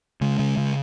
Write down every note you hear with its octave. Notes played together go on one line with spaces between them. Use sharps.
C#3 G#3
C#3
C#3